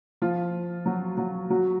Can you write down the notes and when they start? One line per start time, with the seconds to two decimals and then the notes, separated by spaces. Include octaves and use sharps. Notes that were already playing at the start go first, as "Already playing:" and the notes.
0.22 F3 F4
0.85 F#3 F#4
1.17 F#3 F#4
1.50 F#3 F#4